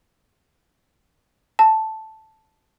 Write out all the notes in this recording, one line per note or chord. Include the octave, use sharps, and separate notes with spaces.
A5